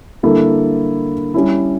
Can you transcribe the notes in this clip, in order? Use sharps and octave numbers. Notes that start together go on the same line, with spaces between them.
D3 G3 A#3 E4 A4
G3 C#4 E4